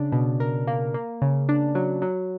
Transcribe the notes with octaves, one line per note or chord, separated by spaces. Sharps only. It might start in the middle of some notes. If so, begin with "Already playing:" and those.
Already playing: C#3 D4
B2
A#4
A#3
A#3
C#3
D4
F#3
F#3